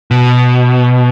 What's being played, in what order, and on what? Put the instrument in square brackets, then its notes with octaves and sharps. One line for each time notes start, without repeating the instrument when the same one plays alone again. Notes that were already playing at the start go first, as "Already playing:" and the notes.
[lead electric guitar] B2